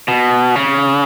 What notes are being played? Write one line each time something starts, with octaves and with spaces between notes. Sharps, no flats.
B2
C#3